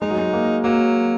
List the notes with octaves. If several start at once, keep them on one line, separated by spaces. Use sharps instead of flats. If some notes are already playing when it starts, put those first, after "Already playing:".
G#3 D#4
F#3
G#3
A#3
F#3 A#3